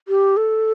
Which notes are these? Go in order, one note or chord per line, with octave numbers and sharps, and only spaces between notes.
G4
A4